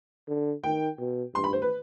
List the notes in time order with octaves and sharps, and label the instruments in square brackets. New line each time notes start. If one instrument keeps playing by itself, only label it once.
[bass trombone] D3
[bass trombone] D#3 [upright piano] G5
[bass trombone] B2
[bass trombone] G2 [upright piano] C6
[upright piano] B5
C5
B4